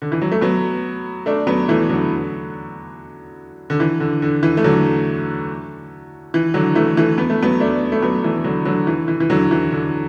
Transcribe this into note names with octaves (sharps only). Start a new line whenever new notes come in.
D3
E3
F#3
A3
F#3 B3
A3 D4
F#3 B3
E3 A3
D3 F#3
D3
E3
D3
D3
E3
A3
D3 F#3
E3
D3 F#3
E3 A3
E3 A3
B3
A3
F#3 B3
A3 D4
A3
F#3 B3
E3 A3
D3 F#3
D3 F#3
E3
E3
E3
D3 F#3
E3
D3